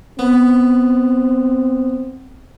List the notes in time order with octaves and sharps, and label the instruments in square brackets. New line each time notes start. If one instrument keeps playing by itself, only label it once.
[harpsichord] B3 [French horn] C4